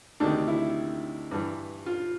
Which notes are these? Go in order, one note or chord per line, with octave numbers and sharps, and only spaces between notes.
D2 C3 D#3 D4
E4
G2 E3
F4